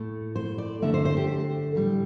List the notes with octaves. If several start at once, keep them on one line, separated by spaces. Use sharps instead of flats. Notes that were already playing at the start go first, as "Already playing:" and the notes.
Already playing: A2 A3
C5
D5
D3 A3 E5
C5
C5
G4
A2 G3